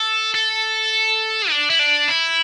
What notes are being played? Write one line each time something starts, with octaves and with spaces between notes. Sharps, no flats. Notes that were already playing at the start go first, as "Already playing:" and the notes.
Already playing: A4
A4
D4
E4
D4
E4